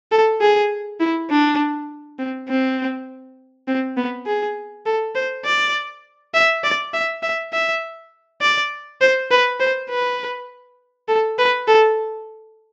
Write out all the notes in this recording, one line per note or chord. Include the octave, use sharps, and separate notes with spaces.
A4
G#4
E4
D4
C4
C4
C4
B3
G#4
A4
C5
D5
E5
D5
E5
E5
E5
D5
C5
B4
C5
B4
A4
B4
A4